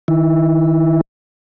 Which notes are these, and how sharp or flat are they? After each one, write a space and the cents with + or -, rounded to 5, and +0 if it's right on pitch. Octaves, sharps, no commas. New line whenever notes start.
D#3 +15 E4 +0